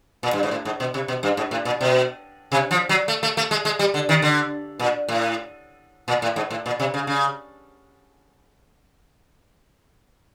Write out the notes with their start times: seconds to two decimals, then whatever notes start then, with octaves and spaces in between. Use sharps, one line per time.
0.23 A#2
0.33 G2
0.43 G#2
0.51 A2
0.65 G#2
0.80 B2
0.94 C3
1.08 B2
1.23 G2
1.37 G#2
1.51 A2
1.65 A#2
1.81 B2
2.52 C3
2.71 F3
2.89 F#3
3.08 A3
3.23 A3
3.37 A3
3.51 G#3
3.65 G#3
3.79 G3
3.94 D3
4.09 D#3
4.22 D3
4.79 A#2
5.08 A2
6.08 A#2
6.22 A2
6.36 G#2
6.50 A2
6.66 A#2
6.80 C3
6.94 C#3
7.07 C#3